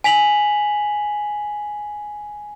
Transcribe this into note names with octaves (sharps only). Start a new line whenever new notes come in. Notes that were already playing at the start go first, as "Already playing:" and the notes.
G#5 B6 F7 F#7